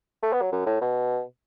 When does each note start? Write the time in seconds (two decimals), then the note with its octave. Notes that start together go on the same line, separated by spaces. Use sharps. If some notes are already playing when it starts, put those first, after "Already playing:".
0.23 A3
0.33 B3
0.42 F#3
0.52 F#2
0.66 A2
0.81 B2